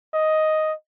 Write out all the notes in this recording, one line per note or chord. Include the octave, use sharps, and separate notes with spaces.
D#5